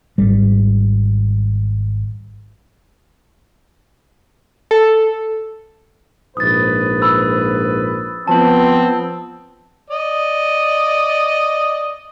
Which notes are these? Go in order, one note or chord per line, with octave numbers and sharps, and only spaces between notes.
G#1 G3
A4
A#1 G#2 B4 D#6 A6
B5 E6
F3 B3 C4 A5 F#7
D5 D#5